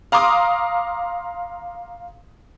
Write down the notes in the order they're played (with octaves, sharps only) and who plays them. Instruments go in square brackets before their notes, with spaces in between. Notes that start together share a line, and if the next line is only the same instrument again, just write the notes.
[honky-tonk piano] F5 A#5 C6 D6 D#6